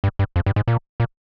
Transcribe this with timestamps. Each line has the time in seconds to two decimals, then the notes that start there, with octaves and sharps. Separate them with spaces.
0.04 G2
0.19 G2
0.36 F2
0.46 G2
0.56 G#2
0.68 A#2
1.00 A#2